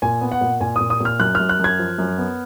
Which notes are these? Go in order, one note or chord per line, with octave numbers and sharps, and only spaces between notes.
A#2 G#5
B3
F#5
A#2
A#2 G#5
A#2 D#6
D#6
A#2 F6
F#2 F#6
F#2 F6
F#6
F#2 G#6
F3
F#2
B3